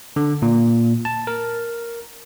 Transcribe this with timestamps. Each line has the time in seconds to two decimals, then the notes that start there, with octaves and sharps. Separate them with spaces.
0.16 D3
0.42 A#2
1.05 A5
1.27 A#4